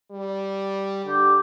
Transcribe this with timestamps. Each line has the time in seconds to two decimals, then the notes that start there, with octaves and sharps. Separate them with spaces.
0.11 G3
1.05 D3 G4